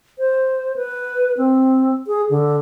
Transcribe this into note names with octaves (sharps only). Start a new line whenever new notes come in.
C5
B4
C4
G#4
D3